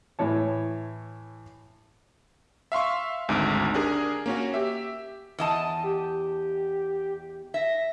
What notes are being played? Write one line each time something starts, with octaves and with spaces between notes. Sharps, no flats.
A2 E3 C#5 A5
E5 F5 C6 C#6
G#1 D2 G#2
D4 G4 G#4 A#4
A#3 C#4 F#4
G4 E5
E2 D#5 A5
G4
E5 A#6